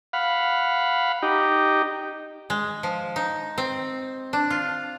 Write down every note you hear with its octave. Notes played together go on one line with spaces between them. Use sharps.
F5 F#5 B5
D#4 G4
G#3
F3
D#4
C4
D4
F4